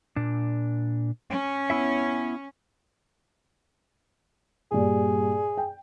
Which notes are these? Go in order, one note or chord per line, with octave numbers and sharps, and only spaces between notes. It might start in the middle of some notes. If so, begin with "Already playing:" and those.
A#2 D4
C#4
B3 E4 E5
G2 A#2 G#4
G5